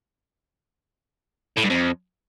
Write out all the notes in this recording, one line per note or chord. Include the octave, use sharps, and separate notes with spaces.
A2
G2
F2